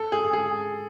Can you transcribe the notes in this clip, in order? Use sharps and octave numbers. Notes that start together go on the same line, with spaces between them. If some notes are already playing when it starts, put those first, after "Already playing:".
Already playing: A4
G#4
G#4